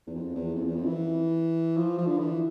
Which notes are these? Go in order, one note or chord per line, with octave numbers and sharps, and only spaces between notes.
E2
F2
E2
F2
E2
F2
E3
F3
F3
D3
E3